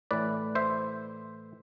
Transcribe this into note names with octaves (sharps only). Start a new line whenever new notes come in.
A2 E3 B4 D5
C5 E5